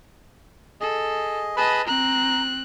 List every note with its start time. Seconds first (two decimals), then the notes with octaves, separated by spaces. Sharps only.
0.81 G#4 A4 D#5
1.57 G#4 B4 D#5 A5 B5
1.87 C4 A#5 F#6